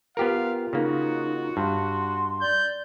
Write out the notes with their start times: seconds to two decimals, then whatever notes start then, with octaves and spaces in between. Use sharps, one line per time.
0.17 B3 F4 G4 A#4 F5
0.73 C#3 A#3 D#4 F#4
1.57 G2 C6
2.41 D5 G6